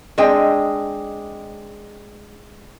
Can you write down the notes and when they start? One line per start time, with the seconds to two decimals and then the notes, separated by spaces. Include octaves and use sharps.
0.18 G#3 C4 D4 D#5 G5